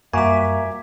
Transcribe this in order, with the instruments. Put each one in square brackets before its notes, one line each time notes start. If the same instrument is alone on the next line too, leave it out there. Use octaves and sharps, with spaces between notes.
[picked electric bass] F#2 G3 [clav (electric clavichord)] A#3 F#4 [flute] E5 [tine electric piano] G#5 D6